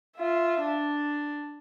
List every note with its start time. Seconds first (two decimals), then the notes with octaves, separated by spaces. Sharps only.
0.16 F4 E5
0.61 D4